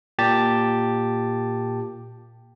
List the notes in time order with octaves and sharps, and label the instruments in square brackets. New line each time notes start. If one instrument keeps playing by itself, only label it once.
[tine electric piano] A#2 G4 A5 A6